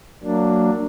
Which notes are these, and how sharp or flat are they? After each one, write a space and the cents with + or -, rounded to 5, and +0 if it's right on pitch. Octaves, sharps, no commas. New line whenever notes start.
F#3 +0 A#3 -20 D4 +0